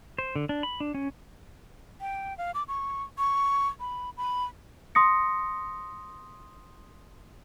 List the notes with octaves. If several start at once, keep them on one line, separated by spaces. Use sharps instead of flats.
C5
D3
D4
B5
D4
C#4
G5
F5
D6
C#6
C#6
B5
B5
C6 D#6 A#6 C#7